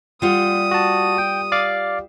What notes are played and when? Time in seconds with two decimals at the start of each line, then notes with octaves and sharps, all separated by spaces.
0.22 G3 F4 F#5 D#6
0.71 F#4 A5
1.18 G5
1.52 D5 F5 D6